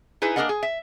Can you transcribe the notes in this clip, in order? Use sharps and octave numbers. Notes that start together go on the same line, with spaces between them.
D#4 E4 G#4 B4
A#3 D4 G#4 A#4 D#5 F#5
G#4
E5